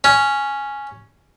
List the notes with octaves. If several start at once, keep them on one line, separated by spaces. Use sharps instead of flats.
C#4